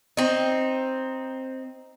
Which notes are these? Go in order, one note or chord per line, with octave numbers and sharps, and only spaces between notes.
C4 D#4